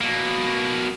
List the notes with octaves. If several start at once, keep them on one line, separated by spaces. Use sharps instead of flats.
B2 A#3